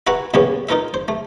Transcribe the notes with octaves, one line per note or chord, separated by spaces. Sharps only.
E4 F#4 B4 F#5 A#5 B5
E2 A#2 G3 B3 C#4 B4
D#4 F4 A#4 B4 E5
C5
A3